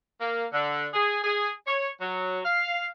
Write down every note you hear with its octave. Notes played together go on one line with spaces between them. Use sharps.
A#3
D3
G#4
G#4
C#5
F#3
F5